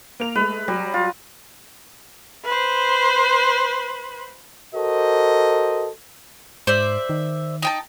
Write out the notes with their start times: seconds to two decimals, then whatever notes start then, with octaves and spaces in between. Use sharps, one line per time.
0.20 A#3 A#4 F7
0.35 G#3 A3 B4
0.68 F#3 G3
0.94 F4
2.45 B4 C5
4.75 F#4 A4 A#4 C5 D#5
6.67 G#2 C5 D5 E5
7.09 D#3
7.63 D#4 G5 A5